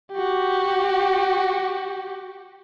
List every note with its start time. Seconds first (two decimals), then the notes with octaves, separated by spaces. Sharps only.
0.13 F#4 G4